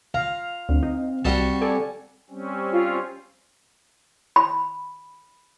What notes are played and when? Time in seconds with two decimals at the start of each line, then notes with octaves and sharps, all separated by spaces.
0.14 F5 A#5
0.69 D2 C4
0.83 D#4
1.25 C2 G3 F#4 A5
1.61 A4 D5 G#5
2.30 G3 C4 C#4
2.72 F4
4.36 B5